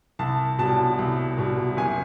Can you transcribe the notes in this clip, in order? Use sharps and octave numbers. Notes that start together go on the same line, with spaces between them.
C2 A5
B2 G3 A5
C2
B2 G3
F#1 G#5